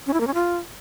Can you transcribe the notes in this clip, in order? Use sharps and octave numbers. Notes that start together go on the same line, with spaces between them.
C#4
E4
A#3
C#4
F4